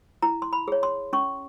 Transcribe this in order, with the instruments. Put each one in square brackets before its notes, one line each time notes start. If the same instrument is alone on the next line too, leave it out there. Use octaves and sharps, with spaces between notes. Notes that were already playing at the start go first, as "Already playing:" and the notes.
[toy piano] E4 A#5
C6
B5
G#4 C#5
C6
C#4 C#6